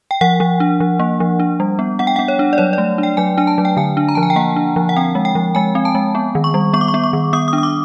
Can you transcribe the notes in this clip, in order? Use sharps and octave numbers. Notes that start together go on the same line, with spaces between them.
G5
F3 F#5
F3
D4
F3
A#3
F3
D4
G3
B3
B3 F#5
G5
B3 F#5
C#5
D4
D5
F#3 C#5
A3 D5
D4
G5
F#3 G#5
D4 G#5
A5
F#3
G5
D3 G#5
D4
A#5
F3 A5
G#5
G5
A#3 F#5
D4
F3
F#5
C4 G5
G#3
G5
F3
G#3 G#5
C4
A5
G#3
B3
D#3
C#6
G3
B3 C#6
D6
C#6
B3
C#6
D#3
B3 D#6
D#6
D4
D#6
D6